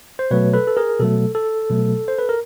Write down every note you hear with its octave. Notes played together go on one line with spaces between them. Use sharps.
C5
B2 F#3 A3 B4 C#5
A4 B4
A4
G#4 A#4
B2 F#3 A3 A4
A4
B2 F#3 A3
C5
B4
A#4